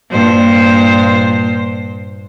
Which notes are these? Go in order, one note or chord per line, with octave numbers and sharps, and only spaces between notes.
G2 A#2 C5